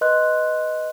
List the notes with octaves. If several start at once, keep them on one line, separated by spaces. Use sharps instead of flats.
B4 D#5 C6 F#6